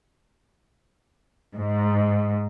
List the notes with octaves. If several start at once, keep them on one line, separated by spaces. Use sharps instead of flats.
G#2